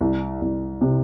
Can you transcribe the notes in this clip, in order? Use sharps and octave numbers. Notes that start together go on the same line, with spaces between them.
C2
C2
C3